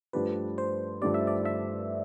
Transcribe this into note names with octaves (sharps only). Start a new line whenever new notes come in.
G2 F3 A3 D4 G4 B4
C5
G2 F3 A3 D4 G4 D5
E5
D5
E5